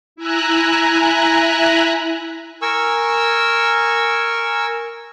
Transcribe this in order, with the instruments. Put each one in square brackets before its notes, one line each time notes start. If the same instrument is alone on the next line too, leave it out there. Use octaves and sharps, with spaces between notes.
[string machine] E4 E5 G#5 A#5 F#6
[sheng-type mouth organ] A#4 G#5 C#6 E6